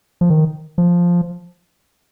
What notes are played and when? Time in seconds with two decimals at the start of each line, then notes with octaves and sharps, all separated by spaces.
0.21 F3
0.30 D#3
0.78 F3